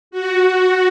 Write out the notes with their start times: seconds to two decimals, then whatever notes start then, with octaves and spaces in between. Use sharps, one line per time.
0.11 F#4